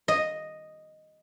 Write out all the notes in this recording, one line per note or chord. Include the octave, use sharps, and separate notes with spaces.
D#5